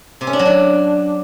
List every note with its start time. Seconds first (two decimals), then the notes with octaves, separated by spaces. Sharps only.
0.21 C3
0.27 C#4
0.33 D4
0.39 F#3
0.45 D4